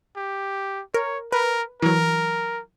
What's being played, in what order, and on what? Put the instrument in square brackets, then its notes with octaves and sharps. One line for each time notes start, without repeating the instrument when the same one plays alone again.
[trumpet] G4
[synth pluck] A#4 [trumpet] C#5
[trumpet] A#4 [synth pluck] B4
[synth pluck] E3 F#3 [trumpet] A#4